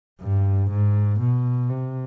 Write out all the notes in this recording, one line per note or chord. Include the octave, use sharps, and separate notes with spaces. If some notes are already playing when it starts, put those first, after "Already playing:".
G2
G#2
B2
C3